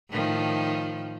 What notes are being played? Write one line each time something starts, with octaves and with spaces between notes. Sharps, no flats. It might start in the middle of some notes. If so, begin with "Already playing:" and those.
A2 D#3 F3